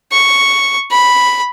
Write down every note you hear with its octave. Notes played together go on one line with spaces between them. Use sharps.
C#6
B5